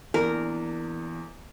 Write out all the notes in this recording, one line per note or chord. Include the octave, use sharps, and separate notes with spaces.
E2 E3 A#3 D4 A#4